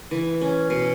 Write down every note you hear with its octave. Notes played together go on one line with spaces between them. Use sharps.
E3
C#4
B2